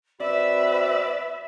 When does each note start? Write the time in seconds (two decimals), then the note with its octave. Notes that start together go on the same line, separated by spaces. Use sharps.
0.20 C4 F#4 B4 D5 E5 B5 E6